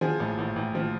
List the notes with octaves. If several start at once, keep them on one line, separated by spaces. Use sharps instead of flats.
F3 G#4
A1
A1
A1
F3